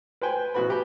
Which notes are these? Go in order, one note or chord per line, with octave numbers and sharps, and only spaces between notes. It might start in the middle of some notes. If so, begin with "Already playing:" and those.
B4 C5 G5 G#5
A1 B2 B3 F#4 B4 B5
G4 G5